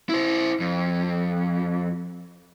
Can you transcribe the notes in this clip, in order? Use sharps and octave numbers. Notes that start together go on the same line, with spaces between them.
E4 C5
F2